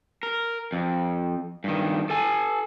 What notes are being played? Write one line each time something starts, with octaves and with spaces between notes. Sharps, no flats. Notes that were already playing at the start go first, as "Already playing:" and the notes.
A#4
F2
G2 D#3
A4 G#5